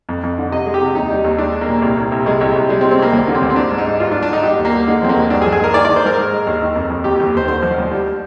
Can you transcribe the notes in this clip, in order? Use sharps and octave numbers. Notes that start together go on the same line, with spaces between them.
F2
F2
D3
C3 D#5
G#3
G4
C3
D#2 D#4
G3
D#2
G#3 D4
G#3
A#3
A#2
C2
C2
C2
C2 G#3
C2
C2
G3 G#3
C4
G3
C4
C2 A#3
D2 A#3
D3
C4
D2
C4
G#2 D4
G#2
D#4
G#2
G2 F4
D4
G2
D4
D3 D#4
G3 G4
D#2
A#3
G3
D3 G#3
F3 C4
A#3
D#2
G2 D4
G#4
F3
G#4
G#3 A#4
D#3 D5
D#3 D5
C5
G#2 A#4
G#3
G#3
D#2
D#3
F2
F2
D#2 G4
D#2 G4
D#2 C5
D3 C5
F3
D2
G3